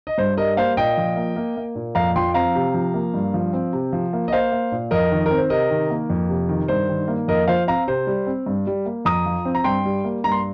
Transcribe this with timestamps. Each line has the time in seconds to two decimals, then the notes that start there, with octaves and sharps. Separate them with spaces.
0.07 D#5
0.18 G2 C5
0.37 G3 A#4 D#5
0.57 A#3 C5 F5
0.77 A#2 D#5 G5
0.97 F3
1.16 A#3
1.36 A#3
1.57 A#3
1.75 A#2
1.95 F2 F5 A#5
2.16 F3 G5 C6
2.34 C4 F5 A#5
2.55 C3
2.74 F3
2.94 A#3
3.14 G2
3.34 F3
3.53 C4
3.73 C3
3.93 F3
4.13 A#3
4.28 D#5
4.33 A#3 C5 F5
4.52 A#3
4.72 A#2
4.91 F2 A#4 D#5
5.12 D#3
5.26 A#4
5.31 C4
5.38 C5
5.50 C3 A#4 D#5
5.70 D#3
5.90 A#3
6.10 F2
6.29 C3
6.49 D#3
6.68 G2 C5
6.89 D#3
7.08 A#3
7.28 F2 A#4 D#5
7.48 F3 C5 F5
7.68 C4 F5 A#5
7.88 C3 C5
8.07 G3
8.27 C4
8.46 G2
8.67 G3
8.86 A#3
9.05 F2 A#5 D#6
9.26 F3
9.45 C4
9.55 A#5
9.64 G2 G5 C6
9.85 G3
10.04 A#3
10.24 G2 A#5
10.32 C6